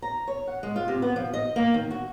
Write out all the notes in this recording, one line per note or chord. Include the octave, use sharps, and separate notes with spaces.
A#5
C#5
F#5
G#3
F4
C3
B3
F3
D#5
A#3
D#3
F#4